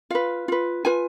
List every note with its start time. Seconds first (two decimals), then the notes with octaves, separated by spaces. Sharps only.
0.10 F4 B4 F5
0.48 F4 B4
0.85 F4 B4 G#5